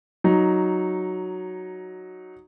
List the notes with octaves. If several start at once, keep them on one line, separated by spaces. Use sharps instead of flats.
F#3 D#4